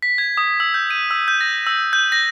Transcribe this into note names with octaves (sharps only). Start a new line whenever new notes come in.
B6
G#6
D#6
E6
G6
D#7
E6
G6
A#6
E6
G6
A#6